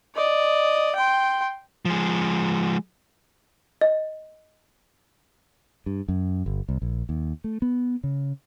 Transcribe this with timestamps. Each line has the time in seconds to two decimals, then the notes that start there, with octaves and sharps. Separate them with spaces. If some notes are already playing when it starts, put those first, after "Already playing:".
0.15 D5 D#5
0.95 G5 C6
1.85 F3 G#3
3.81 D#5
5.86 G2
6.08 F#2
6.46 G1
6.69 C2
6.82 A#1
7.09 D#2
7.44 A3
7.62 B3
8.04 C#3